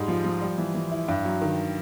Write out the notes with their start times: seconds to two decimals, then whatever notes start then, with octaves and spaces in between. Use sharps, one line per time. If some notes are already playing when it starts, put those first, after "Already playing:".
Already playing: G#2 G3 G#3
0.08 F3
0.24 F3
0.41 G3
0.58 E3
0.75 E3
0.91 E4
1.08 G2
1.25 F#3
1.42 D#3